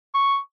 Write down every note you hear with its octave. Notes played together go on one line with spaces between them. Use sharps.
C#6